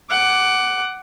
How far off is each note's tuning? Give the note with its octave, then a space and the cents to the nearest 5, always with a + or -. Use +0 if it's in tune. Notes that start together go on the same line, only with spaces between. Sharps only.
F#5 +15 D6 +0